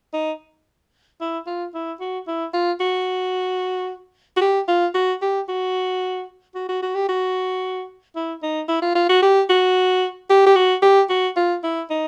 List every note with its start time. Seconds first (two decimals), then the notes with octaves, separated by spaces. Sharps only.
0.13 D#4
1.20 E4
1.47 F4
1.74 E4
2.00 F#4
2.27 E4
2.53 F4
2.80 F#4
4.37 F#4
4.41 G4
4.68 F4
4.94 F#4
5.22 G4
5.49 F#4
6.55 F#4
6.69 F#4
6.82 F#4
6.95 G4
7.09 F#4
8.15 E4
8.43 D#4
8.68 E4
8.82 F4
8.95 F4
9.09 F#4
9.22 G4
9.50 F#4
10.30 G4
10.46 G4
10.56 F#4
10.82 G4
11.10 F#4
11.37 F4
11.63 E4
11.90 D#4